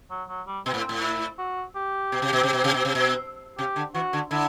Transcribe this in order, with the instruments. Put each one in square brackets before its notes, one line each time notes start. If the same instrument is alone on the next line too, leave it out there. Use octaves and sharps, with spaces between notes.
[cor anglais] F#3
F#3
G3
[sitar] B2 [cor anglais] C4
[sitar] A2 [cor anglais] B3
[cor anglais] C4
[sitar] A2
[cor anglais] E4
F#4
G4
[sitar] B2
C3
B2
C3
B2
C3
B2
C3
B2
[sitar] C3 [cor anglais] G4
[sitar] D3
[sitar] E3 [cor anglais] F#4
[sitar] D3
[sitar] D3 [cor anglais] E4